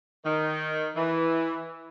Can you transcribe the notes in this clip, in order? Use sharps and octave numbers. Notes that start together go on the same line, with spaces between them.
D#3
E3